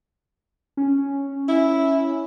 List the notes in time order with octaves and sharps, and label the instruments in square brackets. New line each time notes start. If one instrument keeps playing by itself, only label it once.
[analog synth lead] C#4
[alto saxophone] E4